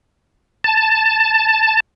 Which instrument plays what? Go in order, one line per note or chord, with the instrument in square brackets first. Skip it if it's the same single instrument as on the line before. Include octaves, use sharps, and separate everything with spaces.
[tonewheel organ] A5